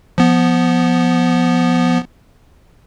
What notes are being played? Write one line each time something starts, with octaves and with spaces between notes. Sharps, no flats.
F3 B3